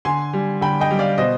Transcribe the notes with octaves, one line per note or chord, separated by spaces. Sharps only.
D3 G#5 C6
G3
D3 G5 B5
D#5 G5
G3
D5 F5
B2 C5 D#5